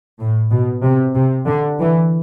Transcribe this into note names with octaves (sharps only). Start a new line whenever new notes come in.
A2
B2
C3
C3
D3
E3